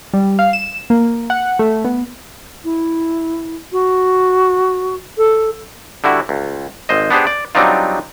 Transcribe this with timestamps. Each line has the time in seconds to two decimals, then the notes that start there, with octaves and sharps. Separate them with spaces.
0.14 G3
0.39 F5
0.53 E7
0.90 A#3
1.30 F#5
1.59 A3
1.84 B3
2.65 E4
3.72 F#4
5.18 A4
6.04 D3 G3 E4 F#4
6.29 C#2
6.89 G#1 C5 D#5
7.11 B3 D4 G4 G#4 C5
7.27 D5
7.55 F#3 G3 C4 D4 D#4 F4